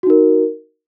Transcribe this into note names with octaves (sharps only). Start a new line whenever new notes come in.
D#4 F#4 A#4